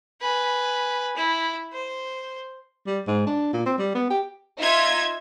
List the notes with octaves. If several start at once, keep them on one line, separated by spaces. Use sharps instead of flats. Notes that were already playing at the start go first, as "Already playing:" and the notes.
B4 G#5
E4
C5
G3
G#2
D4
A#2
C4
G3
B3
G4
D#4 F4 E5 G#6